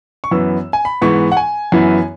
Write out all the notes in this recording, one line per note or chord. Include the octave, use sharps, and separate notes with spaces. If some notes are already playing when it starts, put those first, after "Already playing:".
C#6
F#2 E3 B3 E6
G#5
B5
G#2 E3 B3 C#6
F#5
G#5
F#2 E3 B3 E4